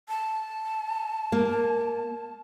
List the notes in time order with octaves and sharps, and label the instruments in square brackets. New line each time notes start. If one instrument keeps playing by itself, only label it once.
[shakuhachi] A5
[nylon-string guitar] A#3